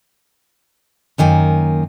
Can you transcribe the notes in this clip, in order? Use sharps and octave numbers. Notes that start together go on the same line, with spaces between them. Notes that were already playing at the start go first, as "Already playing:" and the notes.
F#2 D#3 A#3 G#5